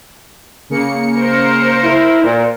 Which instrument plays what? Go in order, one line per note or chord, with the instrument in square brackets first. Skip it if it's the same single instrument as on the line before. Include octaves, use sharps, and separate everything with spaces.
[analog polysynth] C#3 A#3 C#7
[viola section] A#4 C5
[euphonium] E4
A#2